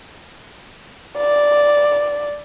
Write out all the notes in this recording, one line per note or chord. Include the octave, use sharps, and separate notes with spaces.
D5